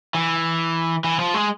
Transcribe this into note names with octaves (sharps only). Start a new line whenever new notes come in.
E3
E3
F3
G#3